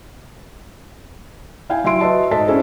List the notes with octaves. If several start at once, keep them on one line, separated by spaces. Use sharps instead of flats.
E4 F5 G5 G#5
F#3 E4 E5 C6 D7
F#4 B4 D#5 E5 A5 C6
G#2 A4 D#5 A5 B6
C#4 D4 E4 G#4 A4 C5